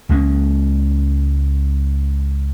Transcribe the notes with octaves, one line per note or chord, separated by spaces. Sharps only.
C#2 G#3 A#3 C#4